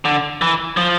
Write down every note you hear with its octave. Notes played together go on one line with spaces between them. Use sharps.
D3
E3
F3